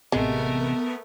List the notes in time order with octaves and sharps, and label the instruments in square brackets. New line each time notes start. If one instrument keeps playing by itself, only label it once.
[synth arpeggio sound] A1 C3 [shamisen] G#3 [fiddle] A3 A#4 [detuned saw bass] B3